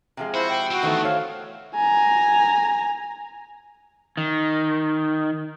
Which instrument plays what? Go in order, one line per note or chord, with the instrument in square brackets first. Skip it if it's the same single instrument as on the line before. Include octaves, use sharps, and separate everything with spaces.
[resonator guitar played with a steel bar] C3 F3 G#3
[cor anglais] E4 [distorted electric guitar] F#4 [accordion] C5
[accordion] G5
[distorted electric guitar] D2 C4 [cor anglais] F#4
[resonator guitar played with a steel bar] D#3 E3 B3 [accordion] A3
[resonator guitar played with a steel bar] C5 C#5 [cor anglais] F5
[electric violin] G#5 A#5
[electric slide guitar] D#3